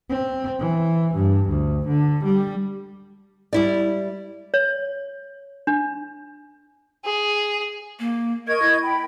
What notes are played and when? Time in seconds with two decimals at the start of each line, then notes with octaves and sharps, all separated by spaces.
0.10 C4
0.60 E3
1.16 G2
1.50 D2
1.88 D3
2.25 G3
3.53 G3 E4 D5
4.54 C#5
5.67 D4
7.04 G#4
7.99 A#3
8.47 A#4 D#5 C#6 G#6
8.62 E4
8.83 G5 B5